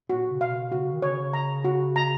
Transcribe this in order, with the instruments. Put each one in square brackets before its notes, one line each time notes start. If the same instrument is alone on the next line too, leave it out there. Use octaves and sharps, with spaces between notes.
[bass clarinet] A#2 [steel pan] F#4
[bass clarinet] C#3
[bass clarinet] B2 [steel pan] F5
[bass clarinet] C#3 [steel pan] F#4
[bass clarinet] D#3
[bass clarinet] C#3 [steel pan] C#5
[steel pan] A#5
F#4
A#5